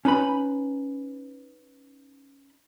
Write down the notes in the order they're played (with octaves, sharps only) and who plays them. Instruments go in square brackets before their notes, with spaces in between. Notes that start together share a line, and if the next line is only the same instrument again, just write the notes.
[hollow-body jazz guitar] C#4 D#4 B4 B5